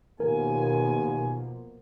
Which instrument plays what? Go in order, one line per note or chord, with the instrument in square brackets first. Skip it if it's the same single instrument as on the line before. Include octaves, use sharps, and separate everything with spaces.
[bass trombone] D#2 [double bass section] B2 F3 A#3 [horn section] F4 G#5 [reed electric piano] A#4